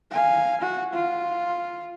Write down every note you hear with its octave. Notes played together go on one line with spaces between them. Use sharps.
F5 G#5
F#4
F4